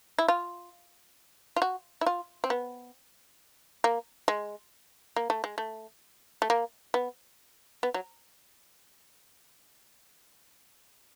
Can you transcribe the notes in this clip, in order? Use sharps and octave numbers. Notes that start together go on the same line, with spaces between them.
E4
F4
F4
F#4
E4
F4
C4
B3
A#3
G#3
A#3
A3
G#3
A3
A3
A#3
B3
B3
F#3